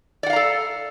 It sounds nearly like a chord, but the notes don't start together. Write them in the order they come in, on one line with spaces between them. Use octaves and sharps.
D5 F#5 F5 A#5 A4